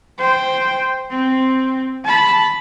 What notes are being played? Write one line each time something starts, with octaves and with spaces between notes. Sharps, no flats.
C5 G5
C4
A5 B5